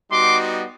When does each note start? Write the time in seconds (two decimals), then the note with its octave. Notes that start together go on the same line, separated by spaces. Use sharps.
0.12 G3 B3 D#4 F#4 C6 D6